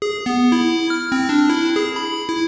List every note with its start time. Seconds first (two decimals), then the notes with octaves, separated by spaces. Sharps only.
0.02 G#4
0.26 B3
0.52 E4
0.90 F6
1.12 C4
1.29 D4
1.50 E4
1.76 G#4
1.96 B5
2.29 E4